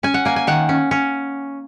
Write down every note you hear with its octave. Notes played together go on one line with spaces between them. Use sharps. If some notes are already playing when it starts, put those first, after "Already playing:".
C#4 G#5
F#5
A#3 G#5
G#5
D#3 F#5
C#4
C#4